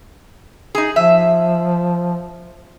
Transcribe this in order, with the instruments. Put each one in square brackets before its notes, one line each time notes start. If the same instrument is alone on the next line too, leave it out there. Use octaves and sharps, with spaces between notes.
[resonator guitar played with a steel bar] D#4 G#4
[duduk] F3 [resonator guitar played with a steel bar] E5